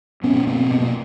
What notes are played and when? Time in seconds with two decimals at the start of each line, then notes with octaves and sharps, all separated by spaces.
0.23 B2 B3 C#4
0.47 B2 A#3 C4
0.71 B2 B3
0.82 A#3